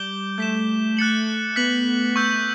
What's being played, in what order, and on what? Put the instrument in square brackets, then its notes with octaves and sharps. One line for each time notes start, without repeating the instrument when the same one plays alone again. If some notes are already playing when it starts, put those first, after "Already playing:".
Already playing: [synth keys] G3 [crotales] D6 G6 D7 G7
[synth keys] A3 [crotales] G6 B6 E7
[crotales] F#6 A6 C#7 F#7
[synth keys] B3 [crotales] F#6 B6 F#7
[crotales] C#6 E6 G6